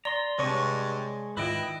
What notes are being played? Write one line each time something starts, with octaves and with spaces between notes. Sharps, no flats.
D5 A#5 C6
G2 C3 G#3 C#5 C#6
G#2 D#3 E4 F4 B4 D#5 G5
D#6